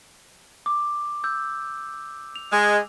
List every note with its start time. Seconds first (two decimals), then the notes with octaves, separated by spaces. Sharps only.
0.66 D6
1.24 E6 G6
2.36 F7
2.51 G#3